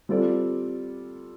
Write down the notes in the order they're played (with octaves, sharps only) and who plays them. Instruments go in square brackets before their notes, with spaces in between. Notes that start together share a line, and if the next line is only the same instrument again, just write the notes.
[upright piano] G3 C4 F4 A4 D5